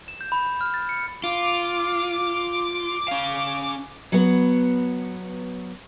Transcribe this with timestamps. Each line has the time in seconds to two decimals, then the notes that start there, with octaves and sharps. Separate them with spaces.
0.08 E7
0.21 G6
0.32 B5
0.46 B5
0.61 F6
0.74 A6
0.89 C#7
1.24 F4 D6
3.08 C#4 F5
4.12 F#3 B3